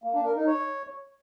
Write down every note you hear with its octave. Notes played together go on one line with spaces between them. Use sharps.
A#3
D4
A#4
D#4
C#5